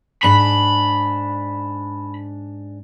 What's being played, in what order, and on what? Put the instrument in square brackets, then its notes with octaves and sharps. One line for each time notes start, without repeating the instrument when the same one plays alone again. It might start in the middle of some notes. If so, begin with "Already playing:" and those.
[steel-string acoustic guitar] G#2 D4 [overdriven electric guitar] B5